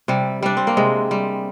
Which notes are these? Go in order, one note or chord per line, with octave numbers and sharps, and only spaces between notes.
C3 G3
G3 D4
C4
A#3
C3 G#3
G3